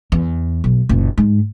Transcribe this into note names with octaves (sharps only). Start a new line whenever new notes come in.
E2
B1
F#1 A#2
G#2